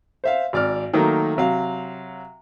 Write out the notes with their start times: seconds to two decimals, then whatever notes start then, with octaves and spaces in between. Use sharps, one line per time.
0.24 C5 E5 F5
0.53 G#1 D5 F6
0.93 D#3 F#3 A3 A#3
1.37 C3 F#3 F5